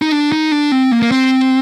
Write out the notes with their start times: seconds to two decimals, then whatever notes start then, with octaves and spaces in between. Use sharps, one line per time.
0.02 D#4
0.12 D4
0.32 D#4
0.52 D4
0.72 C4
0.92 A#3
1.02 A#3
1.11 C4